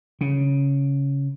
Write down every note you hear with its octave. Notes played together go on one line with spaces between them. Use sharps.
C#3